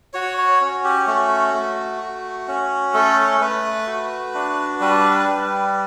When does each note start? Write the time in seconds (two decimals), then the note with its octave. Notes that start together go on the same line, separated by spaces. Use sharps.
0.14 F#4 C#5
0.38 C#5
0.61 C#4
0.84 G4
1.07 A3 F#4
1.54 A3
2.01 F#4
2.48 C#4
2.94 A3 A4
3.40 A3 B4
3.87 F#4
4.34 D4
4.81 G3 B4
5.28 G3